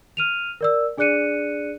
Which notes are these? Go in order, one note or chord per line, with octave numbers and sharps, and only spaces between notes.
F6 D#7 F7
A#4 D5 E6
D4 G#4 D5 F#6 C#7 D#7